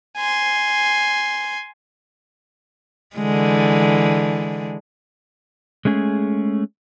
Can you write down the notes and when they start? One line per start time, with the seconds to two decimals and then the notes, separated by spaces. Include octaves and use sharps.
0.17 G#5 C6
3.16 D3 E3 G#3
5.85 G#3 A3 C#4 G#4